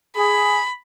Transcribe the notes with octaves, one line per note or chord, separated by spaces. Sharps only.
G#4 B5